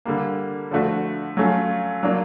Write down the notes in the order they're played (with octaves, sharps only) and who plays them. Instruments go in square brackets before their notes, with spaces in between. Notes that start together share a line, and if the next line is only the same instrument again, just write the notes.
[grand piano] D3 G3 A#3
D3 F3 A3 D4 F#4
F#3 A3 C#4 F4
F#3 A#3 D4 F4